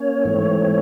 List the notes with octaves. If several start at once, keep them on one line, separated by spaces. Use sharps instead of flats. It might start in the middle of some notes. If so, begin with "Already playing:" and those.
Already playing: A#3 C#4 C#5
G#2 E3 A3 C4